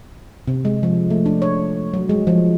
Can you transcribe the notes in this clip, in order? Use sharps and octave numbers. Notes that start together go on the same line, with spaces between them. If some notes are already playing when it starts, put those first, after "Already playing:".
C3
G#3
F3
A3
D4
C#5
F#3
G#3
F3